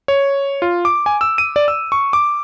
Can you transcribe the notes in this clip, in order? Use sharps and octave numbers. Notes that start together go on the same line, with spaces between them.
C#5
F4
D6
G#5
E6
D#7
D5
E6
C#6
D6